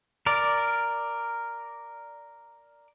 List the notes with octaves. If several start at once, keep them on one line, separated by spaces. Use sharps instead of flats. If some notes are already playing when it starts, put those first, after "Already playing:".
A#4 D5